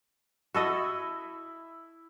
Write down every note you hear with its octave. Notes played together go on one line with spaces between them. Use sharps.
E4 F#4 A4 D#5 E5